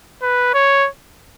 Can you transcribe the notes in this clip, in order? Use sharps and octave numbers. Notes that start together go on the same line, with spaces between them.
B4
C#5